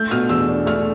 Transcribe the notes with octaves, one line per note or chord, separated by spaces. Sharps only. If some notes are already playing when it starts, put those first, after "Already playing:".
Already playing: A3 G6
B2 F6
E2 E6
D4
A3 F6